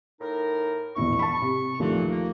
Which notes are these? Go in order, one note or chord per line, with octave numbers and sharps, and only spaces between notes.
A2 D#4 A#4
E1 A#1 E4 C#6
A5 B5
C3
D#2 A#2 E3 F3 A3
A#3